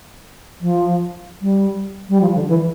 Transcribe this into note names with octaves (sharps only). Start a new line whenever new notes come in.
F3
G3
G3
F3
D3
E3